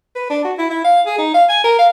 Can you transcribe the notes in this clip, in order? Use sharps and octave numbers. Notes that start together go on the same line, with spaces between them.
B4
D4
F#4
E4
E4
F5
G#4
D#4
F5
G#5
A#4
F5